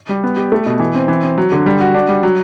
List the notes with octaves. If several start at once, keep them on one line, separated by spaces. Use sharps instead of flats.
G3
B3
G4
A3
B2
E3
C4
E3
C4
F#3
D3
G3
F#4
D4
G3
F#3